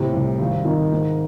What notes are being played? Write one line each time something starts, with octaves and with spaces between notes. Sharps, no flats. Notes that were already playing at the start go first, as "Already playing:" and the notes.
Already playing: A2 C3
C2
G#1
D#3
G#2